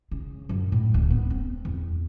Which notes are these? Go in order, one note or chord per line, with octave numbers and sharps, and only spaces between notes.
C#3
F#2
A2
D1
B3
C4
E2